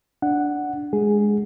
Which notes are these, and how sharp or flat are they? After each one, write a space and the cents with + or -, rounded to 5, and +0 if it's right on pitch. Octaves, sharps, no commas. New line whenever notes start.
D4 +0 F#5 +0
G#3 +0 G#4 +0